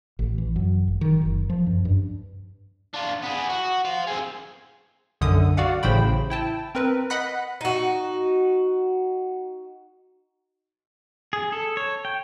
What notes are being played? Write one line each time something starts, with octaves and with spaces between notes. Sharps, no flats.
A1
E3
F#2
G#1
D#3
F#1
F3
F#2
G2
D4 F4
B3 G#4
F#4
C5 F5
C4 G#4
B1 F#2 D3 D#6
F#4 D5 F5 F#5
A1 A2 C#3 C5 G5 B5
E4 G5 A5
C4 A#4 B4
D#5 F#5 B5 F#6 B6
D#4 F#4
G#4
A4
C#5
G5